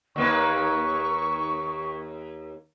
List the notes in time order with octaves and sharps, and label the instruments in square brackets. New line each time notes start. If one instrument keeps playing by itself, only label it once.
[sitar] D#2 A#3 B4 [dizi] C#6